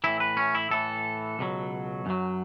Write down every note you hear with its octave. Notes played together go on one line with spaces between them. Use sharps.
A2 E3 E4
B4
C#4
E4
A2 E3 A4
C#2 B2 F#3
F#2 F#3